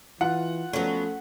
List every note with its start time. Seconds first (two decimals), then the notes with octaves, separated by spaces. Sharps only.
0.21 E3 F4 F#5
0.73 F3 F#3 A3 B3 C#4